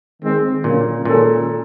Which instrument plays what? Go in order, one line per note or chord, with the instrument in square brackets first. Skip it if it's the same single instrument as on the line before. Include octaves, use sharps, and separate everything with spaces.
[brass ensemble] D#3 G#3 C4
[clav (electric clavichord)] A#2 [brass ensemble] D3 F#3 A#3 C#4
[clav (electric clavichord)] A#2 [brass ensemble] D#3 G#3 C#4 F#4 A4